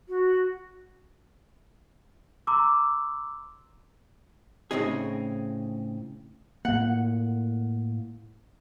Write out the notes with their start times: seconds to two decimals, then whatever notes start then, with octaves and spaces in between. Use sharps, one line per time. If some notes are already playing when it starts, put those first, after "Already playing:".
0.09 F#4
2.47 A#5 C6 D6 E6
4.71 A2 C#3 C4 D#4 G#4
6.65 A2 A#3 F#5